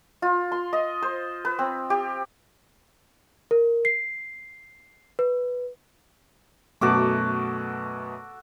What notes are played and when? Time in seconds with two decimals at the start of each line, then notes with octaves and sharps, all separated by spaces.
0.22 F4
0.52 C6
0.73 D#5
1.02 C5
1.45 B4
1.59 C4
1.90 G4
3.51 A#4
3.85 C7
5.19 B4
6.81 F#2 B2 A3 F#4 A4 D6